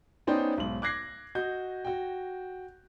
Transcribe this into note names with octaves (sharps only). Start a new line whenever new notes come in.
B3 C#4 D#4 C5 D5 G5
B1 G#2 F#7
D6 F#6 G#6 A#6 C7
F#4 D#5 G6
F#4 G5